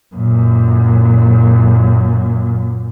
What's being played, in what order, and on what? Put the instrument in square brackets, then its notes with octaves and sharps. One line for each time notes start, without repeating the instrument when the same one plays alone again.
[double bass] F#2 A#2